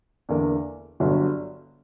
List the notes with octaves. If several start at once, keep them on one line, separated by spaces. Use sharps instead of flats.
E2 D3 A#3
G1 G2 D3 F#3